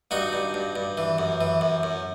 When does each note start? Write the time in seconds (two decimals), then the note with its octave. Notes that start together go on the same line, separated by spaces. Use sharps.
0.11 G2 D#4 F#4
0.33 G2
0.54 G2
0.76 G2
0.97 E3
1.18 F#2
1.41 E3
1.61 F#2
1.83 F#2